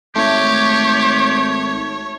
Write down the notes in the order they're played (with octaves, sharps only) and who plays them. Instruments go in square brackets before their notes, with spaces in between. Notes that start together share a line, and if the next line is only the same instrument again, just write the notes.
[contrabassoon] G#1 [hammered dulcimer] A3 [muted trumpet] G4 [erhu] C#5